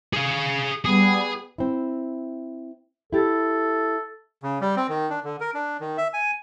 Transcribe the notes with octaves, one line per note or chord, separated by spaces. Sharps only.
G#4 F5
G3 B3 G#4
C4 E4
E4 G4 A4
C#3
G3
C4
D#3
D4
D3
A#4
D4
D#3
E5
G#5